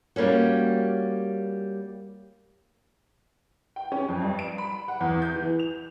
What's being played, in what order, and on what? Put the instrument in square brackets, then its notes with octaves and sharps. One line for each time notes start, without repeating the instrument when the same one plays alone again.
[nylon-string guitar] G3 A#3 C#4 F#4
[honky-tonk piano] G5
C#4
F2
G2
D7
B5
F#5
E2
G6
E3
F7